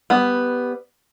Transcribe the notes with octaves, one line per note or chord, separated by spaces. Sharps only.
G3 B3